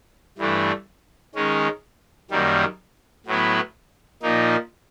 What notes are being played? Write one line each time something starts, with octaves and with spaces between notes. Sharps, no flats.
G2 E3 A3 D4
D#3 G#3 C#4
F#2 D#3 G3 A#3
A2 F#3 B3 E4
A#2 F3 A#3 D#4